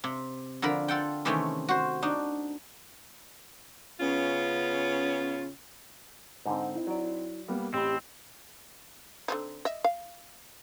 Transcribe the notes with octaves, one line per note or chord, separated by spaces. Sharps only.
C3
D3 F3 A#4 B5
F4 A4 F#5 G5
C3 D#3 E3 A3 C4 C#4
F#4 C5
D4 D#4 F#4
C#3 B3 C#4 F4
G#2 D3 C4 D#4
E4
F#3 D5
G3 A#3 B3
A1 C4 G4 B5
D3 C4 D#4
D#5 E5
F5